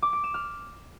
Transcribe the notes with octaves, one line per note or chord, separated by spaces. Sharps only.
D6
D7
E7
F6